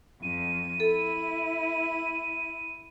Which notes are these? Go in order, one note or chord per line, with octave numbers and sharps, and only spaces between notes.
F2 D#7
E4 A4